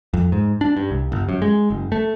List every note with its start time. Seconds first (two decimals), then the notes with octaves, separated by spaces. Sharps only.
0.14 F2
0.32 G#2
0.61 D4
0.77 G2
0.91 C2
1.12 G1
1.29 F#2
1.42 G#3
1.70 F#1
1.92 A3